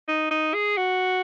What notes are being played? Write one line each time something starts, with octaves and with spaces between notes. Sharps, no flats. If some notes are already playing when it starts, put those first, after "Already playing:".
D#4
D#4
G#4
F#4